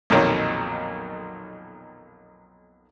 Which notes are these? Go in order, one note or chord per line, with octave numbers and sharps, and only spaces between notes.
B1 F2 A#2 D#3 F#3